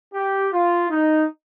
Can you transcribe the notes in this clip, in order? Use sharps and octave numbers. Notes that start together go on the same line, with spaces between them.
G4
F4
D#4